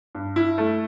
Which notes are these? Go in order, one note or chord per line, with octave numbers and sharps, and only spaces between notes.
G2
E4
A3